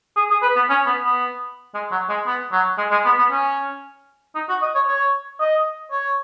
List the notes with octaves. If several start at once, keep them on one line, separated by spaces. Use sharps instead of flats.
G#4
G#4
B4
B3
C#4
B3
B3
G#3
F#3
G#3
B3
F#3
G#3
G#3
B3
B3
C#4
D#4
F#4
D#5
C#5
C#5
D#5
C#5